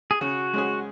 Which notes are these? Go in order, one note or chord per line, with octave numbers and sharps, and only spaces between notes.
G#4
C#3 F#4
G#3 C#4 G#4